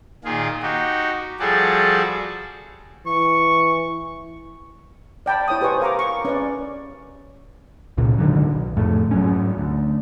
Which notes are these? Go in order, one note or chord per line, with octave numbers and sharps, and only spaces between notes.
A#2 D#3 F4 G#4
D#4 F#4 G4
F3 G3 F#4 G#4 A4 D5
E3 C#6
D5 G5 A5 B5
E4 C#5 G5 D#6
G4 B4 C5 G#5 C#6
A#4 F5 G#5 A#5 B5 D6
C#6
C#4 B4 D5
C#2 A#2 C#3
G#2 D3 D#3 F#3
B1
F2 A2 A3
G#2 F#3 C#4
D2